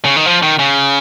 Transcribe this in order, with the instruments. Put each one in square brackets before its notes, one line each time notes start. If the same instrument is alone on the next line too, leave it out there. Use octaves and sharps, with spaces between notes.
[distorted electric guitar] C#3
D#3
F3
D#3
C#3